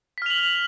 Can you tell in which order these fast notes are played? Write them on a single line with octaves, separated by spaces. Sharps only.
B6 F6 F7 F#7